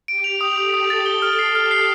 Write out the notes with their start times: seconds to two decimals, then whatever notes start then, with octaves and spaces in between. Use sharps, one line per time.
0.08 G4 D7
0.24 F7
0.41 D#6
0.57 A4 D#6
0.74 D#6
0.90 A6
1.06 G7
1.22 F6
1.39 C7
1.55 G4 F6
1.71 C7